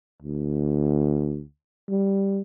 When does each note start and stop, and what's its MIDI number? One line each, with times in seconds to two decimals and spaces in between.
0.22 1.42 38
1.89 2.42 55